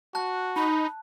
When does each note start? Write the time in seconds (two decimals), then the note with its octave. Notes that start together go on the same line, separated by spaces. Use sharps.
0.15 F#4 A5 F#6
0.56 D#4 B5